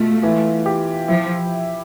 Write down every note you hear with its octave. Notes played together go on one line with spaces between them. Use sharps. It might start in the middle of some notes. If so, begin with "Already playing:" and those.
Already playing: B2 A3 F4
E3
G4
F3 E4